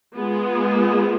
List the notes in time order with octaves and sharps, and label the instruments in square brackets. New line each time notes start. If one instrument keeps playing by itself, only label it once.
[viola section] G#3 B3 F4 G#4